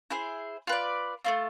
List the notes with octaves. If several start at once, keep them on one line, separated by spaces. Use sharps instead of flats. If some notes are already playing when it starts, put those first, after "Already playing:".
E4 G#4 C5
F4 B4 D5
A3 C4 F4